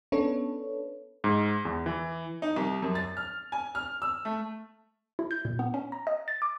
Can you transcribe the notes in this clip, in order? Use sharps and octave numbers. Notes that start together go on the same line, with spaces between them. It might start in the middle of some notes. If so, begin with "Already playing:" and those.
B3 C#4 D4 A4 B4 C#5
G#2
E2
E3
D#4
C2
F#2
A6
F6
G#5
F6
E6
A3
E4
G6
A#2
B3
C#4
A#5
D#5
A6
D6